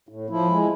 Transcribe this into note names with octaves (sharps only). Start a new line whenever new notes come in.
A2
F3 E4
G#3